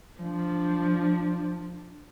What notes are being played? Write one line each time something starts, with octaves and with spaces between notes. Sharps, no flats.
F3 D4